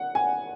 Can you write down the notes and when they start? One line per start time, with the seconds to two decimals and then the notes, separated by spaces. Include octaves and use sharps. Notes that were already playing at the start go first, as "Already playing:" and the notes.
Already playing: F#5
0.15 G#5